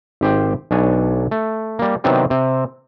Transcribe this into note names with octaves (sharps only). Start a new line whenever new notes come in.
G#1 G4 C5 G5
B1 D4 C#5 G#5
A3
G3 A#3
C3 D#3 F#3 B3 C4 D4
C3 C4